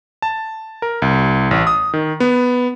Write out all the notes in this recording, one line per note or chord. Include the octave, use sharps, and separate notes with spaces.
A5
A#4
C2
A1
D#6
D#3
B3